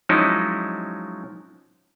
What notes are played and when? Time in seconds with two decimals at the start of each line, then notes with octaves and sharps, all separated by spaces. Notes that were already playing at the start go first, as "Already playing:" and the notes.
0.09 F3 F#3 G#3 C#4 D#4 E4